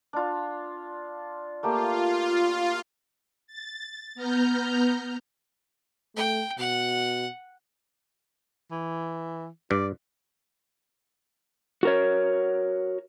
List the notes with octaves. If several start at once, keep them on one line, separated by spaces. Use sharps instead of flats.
D4 F4
A3 A#3 F4 G4
A6
B3 A#5 F6 G6
A3 G5
B2 F#5
E3
G2 D5
F#4 A#4 C#5